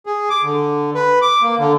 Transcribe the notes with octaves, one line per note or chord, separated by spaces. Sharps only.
G#4
D6
D3
B4
D6
A#3
D3